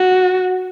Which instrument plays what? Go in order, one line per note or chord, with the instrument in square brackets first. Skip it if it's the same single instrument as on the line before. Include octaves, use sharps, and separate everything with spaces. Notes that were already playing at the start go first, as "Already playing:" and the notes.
Already playing: [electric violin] F#4